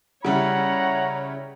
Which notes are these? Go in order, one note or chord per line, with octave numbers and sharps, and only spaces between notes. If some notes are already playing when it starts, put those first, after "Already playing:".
C#3 G3 E4 C#5 F#5 A#5